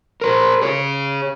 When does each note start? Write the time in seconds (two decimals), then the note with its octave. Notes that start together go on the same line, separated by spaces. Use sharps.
0.21 A#4 C5
0.62 G#4 C#5